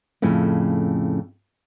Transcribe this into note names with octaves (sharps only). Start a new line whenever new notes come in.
F2 A2 C#3